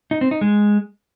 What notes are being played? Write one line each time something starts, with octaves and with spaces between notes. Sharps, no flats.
D#4
C4
D#4
G#3